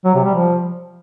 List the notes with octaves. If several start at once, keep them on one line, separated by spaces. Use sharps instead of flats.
F#3
C3
G3
F3